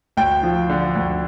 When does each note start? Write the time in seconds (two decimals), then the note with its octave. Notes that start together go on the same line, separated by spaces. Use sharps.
0.17 D2 G5
0.43 F3
0.69 D3
0.95 D2